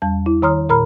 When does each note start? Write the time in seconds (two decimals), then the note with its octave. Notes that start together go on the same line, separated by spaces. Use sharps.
0.02 E2 G3 A5
0.26 E4
0.42 D#3 C#5 A#5 C6 D#6 F6
0.69 A#2 A#4 A#5 B5 F6